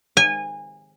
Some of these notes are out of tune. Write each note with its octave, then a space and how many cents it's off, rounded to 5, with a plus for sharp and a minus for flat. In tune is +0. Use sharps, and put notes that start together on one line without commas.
G#5 -25